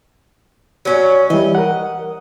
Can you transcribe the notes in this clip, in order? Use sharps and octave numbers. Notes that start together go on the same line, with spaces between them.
F#3 C#4
E3 G3 D#5
A#4 F#5